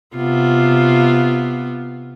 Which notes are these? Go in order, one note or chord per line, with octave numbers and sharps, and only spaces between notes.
C3 B3 F4